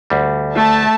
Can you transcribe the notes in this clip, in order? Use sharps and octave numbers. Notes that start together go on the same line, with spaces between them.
D2 G3
A3 E5 A5